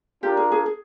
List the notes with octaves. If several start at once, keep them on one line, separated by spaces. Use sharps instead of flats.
D4 F4 G4 A#4 D5
G#4
G#4
G#4